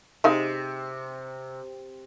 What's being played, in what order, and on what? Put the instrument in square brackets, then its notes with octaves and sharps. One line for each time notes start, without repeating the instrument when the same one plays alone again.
[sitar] C3 [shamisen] G#3 D#4 F5